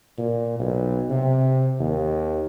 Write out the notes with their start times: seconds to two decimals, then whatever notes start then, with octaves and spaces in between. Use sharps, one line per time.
0.18 A#2
0.59 B1
1.10 C3
1.80 D#2